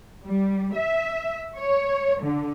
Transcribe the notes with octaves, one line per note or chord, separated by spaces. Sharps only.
G3
E5
C#5
D3